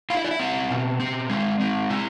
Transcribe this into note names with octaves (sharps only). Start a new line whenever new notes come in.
E4 F5
E5
D5
E5
C4
B2
C4
G#3
C4
E4